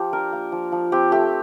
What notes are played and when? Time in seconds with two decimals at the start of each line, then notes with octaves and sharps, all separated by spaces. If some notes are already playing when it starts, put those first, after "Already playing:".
Already playing: F3 G4
0.13 D4 A#4
0.33 A#3
0.52 F3
0.72 F3
0.92 C4 G4
1.12 A3 G4